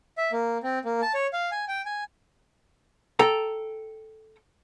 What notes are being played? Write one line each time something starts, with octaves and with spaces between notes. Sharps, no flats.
E5
A#3
C4
A#3
A5
C#5
F5
G#5
G5
G#5
A4 G5 A#5